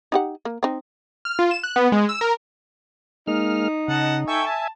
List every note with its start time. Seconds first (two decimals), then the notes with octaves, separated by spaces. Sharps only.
0.12 D#4 G4 F#5
0.45 A#3
0.63 C4 D#4
1.25 F6
1.39 F4
1.51 E7
1.64 F#6
1.76 B3
1.92 G#3
2.09 E6
2.21 A#4
3.27 G#3 A#3 D#4 F6
3.88 C#3 D#5 F#5 A5
4.28 A4 E5 G5 G#5 C#6
4.46 A5